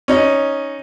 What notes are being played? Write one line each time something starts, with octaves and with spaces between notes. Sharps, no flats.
C#4 D#4